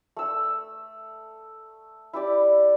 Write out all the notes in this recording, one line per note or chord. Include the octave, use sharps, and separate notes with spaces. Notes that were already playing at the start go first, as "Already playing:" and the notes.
A3 E6
E4 G4 D5